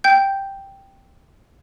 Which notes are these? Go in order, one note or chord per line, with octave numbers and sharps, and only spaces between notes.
G5 G6